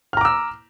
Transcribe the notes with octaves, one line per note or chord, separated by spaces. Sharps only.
A#5 D6 E6 F6